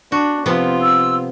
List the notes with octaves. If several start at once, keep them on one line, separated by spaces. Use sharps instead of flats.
D4 F#4
C3 F3 B3 C4 F4
E6